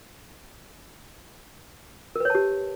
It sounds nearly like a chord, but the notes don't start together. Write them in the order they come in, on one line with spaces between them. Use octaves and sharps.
A#4 B4 C#5 A5 G4